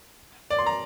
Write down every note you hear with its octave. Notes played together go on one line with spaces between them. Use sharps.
D5
C6
A#5